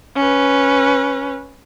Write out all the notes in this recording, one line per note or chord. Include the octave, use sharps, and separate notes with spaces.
C#4 B4